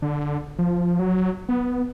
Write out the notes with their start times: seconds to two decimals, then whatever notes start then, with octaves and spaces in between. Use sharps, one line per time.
0.02 D3
0.59 F3
0.99 F#3
1.49 B3